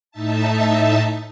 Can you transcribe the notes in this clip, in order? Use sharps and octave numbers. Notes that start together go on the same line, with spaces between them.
A2 D#4 E5 A5